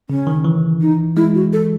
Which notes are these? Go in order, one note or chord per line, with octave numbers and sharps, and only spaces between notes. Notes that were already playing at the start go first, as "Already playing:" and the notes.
C#3 C#4
D#3
E3
D#4
G#3 E4
F#4
A4